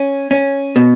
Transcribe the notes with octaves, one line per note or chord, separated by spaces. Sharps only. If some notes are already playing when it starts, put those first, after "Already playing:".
Already playing: C#4
C#4
B2